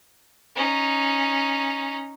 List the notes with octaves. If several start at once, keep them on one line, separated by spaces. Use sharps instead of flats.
C#4 D#4